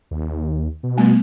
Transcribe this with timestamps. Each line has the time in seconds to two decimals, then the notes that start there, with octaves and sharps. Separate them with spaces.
0.11 D#2
0.83 B2
0.97 G3 A3 B3